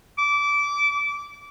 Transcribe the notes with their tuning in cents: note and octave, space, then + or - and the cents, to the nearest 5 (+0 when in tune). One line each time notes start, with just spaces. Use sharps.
D6 -20